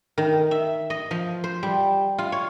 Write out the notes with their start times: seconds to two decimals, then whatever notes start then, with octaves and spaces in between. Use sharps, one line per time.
0.18 D#3
0.51 E5
0.90 D#5
1.11 F3
1.44 C5
1.63 G3
2.18 F4
2.32 C#5